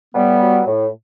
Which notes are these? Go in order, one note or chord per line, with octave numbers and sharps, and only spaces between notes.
A2 G3 B3
F#3
A2